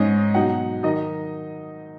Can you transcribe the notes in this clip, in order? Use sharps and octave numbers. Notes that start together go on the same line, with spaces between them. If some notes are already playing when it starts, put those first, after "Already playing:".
Already playing: G#2 G#3 C#4 D#5
B2 F#3 D#4 F#5
D#3 F#3 D#4 D#5